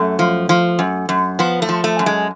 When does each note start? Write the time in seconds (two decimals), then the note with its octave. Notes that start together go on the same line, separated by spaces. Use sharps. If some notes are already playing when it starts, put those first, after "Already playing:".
Already playing: F#2 A3
0.19 F3
0.49 F3
0.79 F#2
1.09 F#2
1.39 F3 B3
1.62 A3
1.69 F3
1.84 A3
1.99 F#2
2.06 G#3